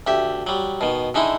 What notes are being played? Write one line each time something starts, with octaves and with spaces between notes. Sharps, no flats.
D2 G4 E5
F#3 G3
B2 D#3
D3 G#3 D#4 E4